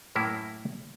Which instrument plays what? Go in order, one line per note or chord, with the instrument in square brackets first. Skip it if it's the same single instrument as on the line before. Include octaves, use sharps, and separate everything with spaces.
[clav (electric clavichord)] F#2 A2 A#3 E4